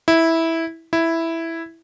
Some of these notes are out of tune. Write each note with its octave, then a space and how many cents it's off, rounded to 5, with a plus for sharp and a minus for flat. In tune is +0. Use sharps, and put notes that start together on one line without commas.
E4 -10
E4 +0